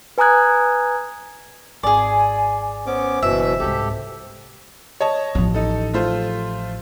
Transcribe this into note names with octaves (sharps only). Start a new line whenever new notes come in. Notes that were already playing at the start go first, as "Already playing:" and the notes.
B4 G#5 A#5 D#6 F#6 G#6
G#1 G#4 D5 G#5
B3 C#4 C5 D6
F#1 B2 E3 E5
C2 G#2 G4 A4
C#5 D#5 A5
A1 F3
D#4 A4
A3 F4 C5